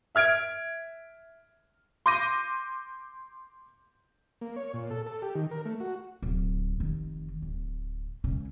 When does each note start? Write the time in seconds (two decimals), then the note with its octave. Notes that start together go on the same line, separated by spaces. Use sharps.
0.15 E5 F6 G#6 D7
2.06 C6 D6 G6 A#6 D#7
4.41 A#3
4.56 C#5
4.74 A#2
4.91 A4
5.06 A4
5.22 G4
5.35 D#3
5.51 A#4
5.65 A3
5.80 F#4
6.22 D1
6.80 F1 D#3
7.42 D1
8.24 C#2 C#3